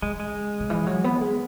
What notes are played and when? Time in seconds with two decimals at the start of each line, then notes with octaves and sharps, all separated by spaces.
0.02 C#3 G#3
0.20 G#3
0.60 C#3
0.70 E3
0.87 F#3
1.04 B3
1.21 G#3